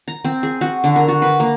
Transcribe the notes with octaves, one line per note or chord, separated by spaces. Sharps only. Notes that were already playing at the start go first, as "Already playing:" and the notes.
A#5
C4
G#4
F#4
D3
A#4
F#4
B4
A#3